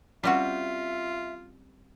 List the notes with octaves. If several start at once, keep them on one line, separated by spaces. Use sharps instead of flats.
G3 C4 C#4 F4 F#4 E5 F#5